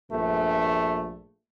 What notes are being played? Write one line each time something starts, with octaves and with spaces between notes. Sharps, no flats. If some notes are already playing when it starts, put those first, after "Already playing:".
A#1 G2 A3